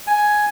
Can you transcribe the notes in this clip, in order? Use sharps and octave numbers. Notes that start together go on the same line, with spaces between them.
G#5